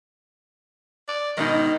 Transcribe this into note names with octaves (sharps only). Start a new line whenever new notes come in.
D5
G#2 B2 D#3 D#4